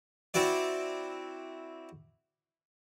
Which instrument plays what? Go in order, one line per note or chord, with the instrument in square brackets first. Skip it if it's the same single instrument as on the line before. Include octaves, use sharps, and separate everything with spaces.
[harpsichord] C4 E4 F#4 D5